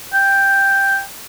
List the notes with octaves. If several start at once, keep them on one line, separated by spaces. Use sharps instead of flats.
G5